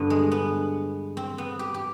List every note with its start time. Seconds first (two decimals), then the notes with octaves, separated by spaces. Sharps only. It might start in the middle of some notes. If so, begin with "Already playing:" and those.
Already playing: G2 D3 B3
0.10 G#3
0.32 B3
1.17 C4
1.38 B3
1.59 G4
1.74 G4